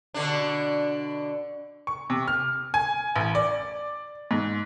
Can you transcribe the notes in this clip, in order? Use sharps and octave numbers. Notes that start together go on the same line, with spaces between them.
B2 D3 D4
C#6
C3
F6
G#5
A1
D5
G#2